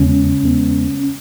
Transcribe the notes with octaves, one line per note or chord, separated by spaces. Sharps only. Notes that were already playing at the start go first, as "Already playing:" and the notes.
Already playing: E2 C#3 G#3 B3 C#4
E2 C#3 G#3 B3